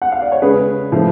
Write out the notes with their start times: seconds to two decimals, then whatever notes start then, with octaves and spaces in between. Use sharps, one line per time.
0.02 F#5
0.12 F5
0.22 D5
0.32 C#5
0.42 C#3 G#3 G#4 B4
0.92 A2 F3 A3